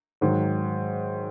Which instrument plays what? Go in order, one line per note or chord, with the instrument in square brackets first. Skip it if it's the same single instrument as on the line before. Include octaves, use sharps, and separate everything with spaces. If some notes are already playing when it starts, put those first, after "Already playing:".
[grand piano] G#2 D#3 F#3